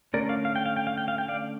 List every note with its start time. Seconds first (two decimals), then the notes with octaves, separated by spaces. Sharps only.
0.14 D3 A3 C#4 A#4 D5
0.29 D5 F5
0.45 F5
0.56 G5
0.66 F5
0.76 G5
0.87 F5
0.98 G5
1.08 F5
1.18 G5
1.28 D5 F5